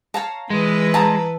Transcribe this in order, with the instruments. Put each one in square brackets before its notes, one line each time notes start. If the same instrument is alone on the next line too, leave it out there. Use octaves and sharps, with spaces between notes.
[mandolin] C#5 F5 A#5 [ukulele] A5
[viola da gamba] E3 B4 [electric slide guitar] G#3
[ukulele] A5 [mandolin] A#5 D#6